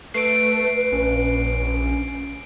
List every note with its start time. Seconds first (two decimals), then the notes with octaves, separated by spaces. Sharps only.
0.14 A3 B4 C7 D7
0.92 A#1 C#4